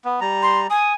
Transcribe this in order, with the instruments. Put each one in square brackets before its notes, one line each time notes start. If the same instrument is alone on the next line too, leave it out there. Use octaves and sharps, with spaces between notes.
[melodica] B3
G3 A#5
[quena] C6
[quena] G#5 [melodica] D#6